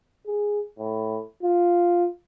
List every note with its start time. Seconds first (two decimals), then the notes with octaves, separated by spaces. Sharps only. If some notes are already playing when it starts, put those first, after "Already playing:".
0.27 G#4
0.79 A2
1.43 F4